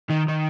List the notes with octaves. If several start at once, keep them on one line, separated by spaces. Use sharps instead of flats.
D#3
D#3